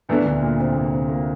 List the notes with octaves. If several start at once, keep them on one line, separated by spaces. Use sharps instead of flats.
E2 A#2 E3 A3 D4
D2 D3
A#2 A#3
C3 C4
A#2 A#3
C3 C4
A#2 A#3